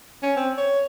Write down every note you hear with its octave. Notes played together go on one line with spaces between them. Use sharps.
C#4
C4
C#5